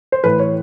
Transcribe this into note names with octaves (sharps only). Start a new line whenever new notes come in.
C5
A2 E3 B4
C#5